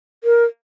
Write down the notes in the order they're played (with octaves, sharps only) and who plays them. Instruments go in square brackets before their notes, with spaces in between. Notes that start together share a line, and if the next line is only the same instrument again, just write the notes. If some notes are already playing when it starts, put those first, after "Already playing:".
[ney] A#4